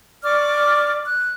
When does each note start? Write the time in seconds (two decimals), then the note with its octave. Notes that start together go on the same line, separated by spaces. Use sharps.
0.24 D5 C#6 D6 F6
1.05 F#6